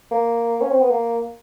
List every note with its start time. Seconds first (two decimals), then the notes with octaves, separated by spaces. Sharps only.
0.11 A#3
0.61 C#4
0.71 C4
0.81 B3
0.90 A#3